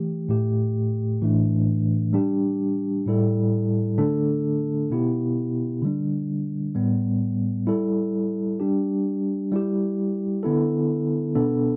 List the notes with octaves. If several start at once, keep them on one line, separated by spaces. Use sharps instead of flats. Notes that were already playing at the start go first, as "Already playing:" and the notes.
Already playing: E3 A3 G4
A2 A3 G4
A2 E3 A3 D4
G3 D4 G4
A2 G3 E4 A4
D3 A3 D4 A4
B2 B3 E4 G4
D3 G3 D4
A2 G3 B3
G3 E4 A4
G3 D4 G4
G3 E4 G4
D3 B3 E4 A4
B2 B3 D4 A4